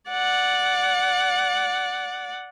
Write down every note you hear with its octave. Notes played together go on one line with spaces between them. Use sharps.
D5 F#5